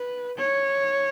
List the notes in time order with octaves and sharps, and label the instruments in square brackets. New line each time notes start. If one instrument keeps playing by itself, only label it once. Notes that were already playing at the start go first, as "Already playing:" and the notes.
Already playing: [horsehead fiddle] B4
C#5